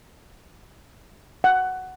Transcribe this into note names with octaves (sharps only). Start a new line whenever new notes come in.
F#5